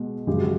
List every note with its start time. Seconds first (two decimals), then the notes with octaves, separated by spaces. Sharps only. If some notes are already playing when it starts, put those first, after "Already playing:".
Already playing: B2 G#3
0.27 F#2 C#3 F3 G#3 G4
0.39 F#4